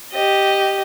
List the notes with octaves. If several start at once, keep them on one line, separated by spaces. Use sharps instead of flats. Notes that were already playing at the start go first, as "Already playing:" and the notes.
G4 D#5